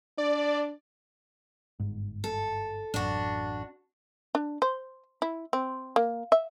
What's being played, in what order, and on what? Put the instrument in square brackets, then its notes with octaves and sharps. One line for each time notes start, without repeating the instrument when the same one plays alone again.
[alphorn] D4 [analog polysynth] D5
[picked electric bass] G1 G#2
[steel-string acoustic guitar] A4
[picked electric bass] A1 F#2 [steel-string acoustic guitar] D4 F#4
[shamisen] D4
C5
E4
C4
A#3
E5